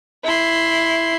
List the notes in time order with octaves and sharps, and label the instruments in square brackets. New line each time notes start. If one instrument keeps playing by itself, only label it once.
[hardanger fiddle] E4 C6